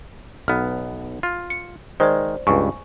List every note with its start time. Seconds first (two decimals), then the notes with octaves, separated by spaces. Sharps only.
0.48 B1 B3 F6
1.23 F4
1.50 C#7
2.00 D#3 G#3 C5 D5
2.47 C#2 G2 G#5 C#6